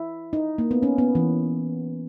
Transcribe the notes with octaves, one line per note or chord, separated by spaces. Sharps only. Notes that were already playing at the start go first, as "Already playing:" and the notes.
Already playing: E4
D#4
A#3
B3
C#4
B3
E3